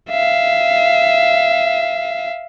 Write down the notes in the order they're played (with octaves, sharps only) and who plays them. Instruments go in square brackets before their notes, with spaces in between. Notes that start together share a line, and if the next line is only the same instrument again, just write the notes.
[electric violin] E5 F5